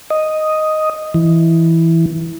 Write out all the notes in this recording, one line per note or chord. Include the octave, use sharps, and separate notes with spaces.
D#5
E3